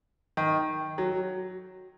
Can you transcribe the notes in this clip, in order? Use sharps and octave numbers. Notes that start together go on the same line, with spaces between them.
D#3
F#3